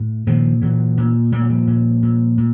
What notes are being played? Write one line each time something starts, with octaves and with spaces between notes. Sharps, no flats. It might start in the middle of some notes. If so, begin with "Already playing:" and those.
Already playing: A2
A#2 D#3 F3
A#2 E3 F#3
A#2
A#2 G3
F#3
F3 G3
A#2
A#2
A#2